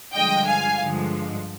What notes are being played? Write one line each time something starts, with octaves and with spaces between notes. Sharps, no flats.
G2 D3 F3 G#3 D#5 G5
F5 G#5
G2 D3 F3 G#3